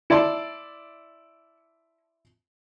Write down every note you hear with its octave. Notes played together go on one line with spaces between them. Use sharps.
E4 D5 A5 C6